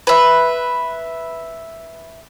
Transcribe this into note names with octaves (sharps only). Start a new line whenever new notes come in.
B4 E5